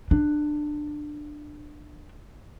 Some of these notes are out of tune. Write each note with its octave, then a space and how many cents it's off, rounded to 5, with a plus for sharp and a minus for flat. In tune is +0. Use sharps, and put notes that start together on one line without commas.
D4 +20